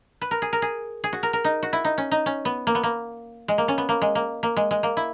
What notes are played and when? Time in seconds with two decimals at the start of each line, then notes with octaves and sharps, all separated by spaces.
0.21 B4
0.31 A#4
0.42 G#4
0.53 A#4
0.62 G#4
1.04 G#4
1.13 F#4
1.23 A#4
1.33 A#4
1.44 D#4
1.63 F#4
1.73 E4
1.85 D#4
1.98 C#4
2.11 D#4
2.26 C#4
2.45 B3
2.67 A#3
2.75 B3
2.83 A#3
3.48 G#3
3.58 A#3
3.68 C#4
3.78 B3
3.89 A#3
4.02 G#3
4.15 A#3
4.43 A#3
4.57 G#3
4.71 G#3
4.83 A#3
4.97 E4